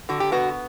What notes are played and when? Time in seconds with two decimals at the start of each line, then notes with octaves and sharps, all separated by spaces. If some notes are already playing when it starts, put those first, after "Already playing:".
0.09 D3 F#4
0.20 G4
0.32 B3 F#4